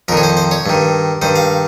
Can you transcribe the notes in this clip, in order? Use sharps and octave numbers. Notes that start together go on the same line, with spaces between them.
F2 D#3 A#4
C#5
C5
C5
C#5
G2 D#3
G2 D#3 C5
F5